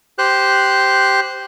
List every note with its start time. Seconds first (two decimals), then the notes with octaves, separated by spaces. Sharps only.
0.19 G4 C5 F#6